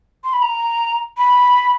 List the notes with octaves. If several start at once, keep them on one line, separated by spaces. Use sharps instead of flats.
C6
B5
A#5
B5